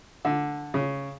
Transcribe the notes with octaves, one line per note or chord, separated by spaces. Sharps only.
D3
C#3